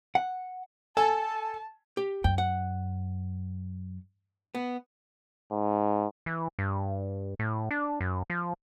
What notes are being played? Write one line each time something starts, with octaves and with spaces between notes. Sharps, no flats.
F#5
A4 G#5 A5
G4
F#2 G5
F#5
B3
G#2
E3
G2
A2
D4
F#2
F3